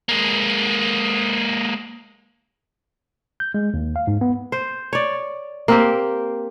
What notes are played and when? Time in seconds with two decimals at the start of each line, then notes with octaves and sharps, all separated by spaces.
0.09 G#3 A#3
3.40 G6
3.54 G#3
3.74 D#2
3.96 F5
4.07 G#2
4.21 B3
4.52 C5
4.93 C#5 D5
5.68 A#3 C4 G4